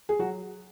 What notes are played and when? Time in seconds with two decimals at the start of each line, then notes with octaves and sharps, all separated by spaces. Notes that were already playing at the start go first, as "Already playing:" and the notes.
0.09 G#4
0.19 F#3 F#4